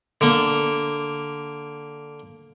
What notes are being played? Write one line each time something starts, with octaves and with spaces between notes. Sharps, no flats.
D3 A#3